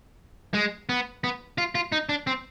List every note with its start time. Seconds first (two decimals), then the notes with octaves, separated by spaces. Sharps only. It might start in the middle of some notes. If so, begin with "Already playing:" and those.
0.54 G#3
0.89 B3
1.24 B3
1.58 F4
1.75 F4
1.92 D#4
2.09 D4
2.27 C4